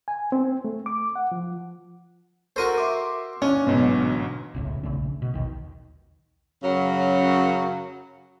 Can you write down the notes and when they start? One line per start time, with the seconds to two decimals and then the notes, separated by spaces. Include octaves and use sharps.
0.08 G#5
0.32 C4
0.65 A3
0.86 D6
1.16 F#5
1.32 F3
2.56 F#4 A4 A#4 C5 C#6 D#7
2.78 E5 C6 D6
3.42 C#4 D4
3.67 A1 G#2 B2 D3 F#3
4.55 E1 C#2 A2
4.83 A#1 C#3 A3 D4
5.22 B2
5.34 A#1 D#2 D#3
6.63 F#2 C#3 F#3